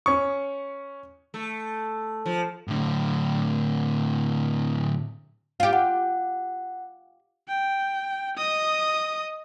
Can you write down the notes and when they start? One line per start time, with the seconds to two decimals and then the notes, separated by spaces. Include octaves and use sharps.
0.06 C#4 C#6
1.34 A3
2.26 F3
2.68 A2 D3
5.60 F4 G4
5.73 F#5
7.48 G5
8.37 D#5 D#6